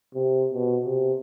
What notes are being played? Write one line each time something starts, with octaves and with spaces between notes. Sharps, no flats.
C3
B2
C3